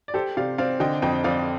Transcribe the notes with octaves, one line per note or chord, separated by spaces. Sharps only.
D5
G4 A4 C5
C3 D5 F5
C4 D5 F5
D3 D#5 G5
F2 D#5 G5
F2 D5 F5